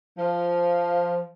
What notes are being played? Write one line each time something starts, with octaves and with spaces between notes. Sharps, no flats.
F3